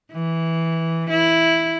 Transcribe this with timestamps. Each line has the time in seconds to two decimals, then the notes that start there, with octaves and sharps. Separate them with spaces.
0.12 E3
1.10 E4